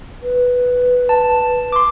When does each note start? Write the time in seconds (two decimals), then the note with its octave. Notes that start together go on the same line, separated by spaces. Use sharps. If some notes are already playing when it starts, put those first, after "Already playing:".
0.23 B4
1.09 A5
1.72 C6 D6